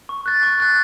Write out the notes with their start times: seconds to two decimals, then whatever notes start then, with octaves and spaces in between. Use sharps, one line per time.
0.09 C#6
0.26 F#6 A6
0.43 C#6
0.60 F#6 A6